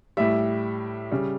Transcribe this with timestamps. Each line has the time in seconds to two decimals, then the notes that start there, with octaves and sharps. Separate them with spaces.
0.17 A2 G3 E5
1.12 C#3 G3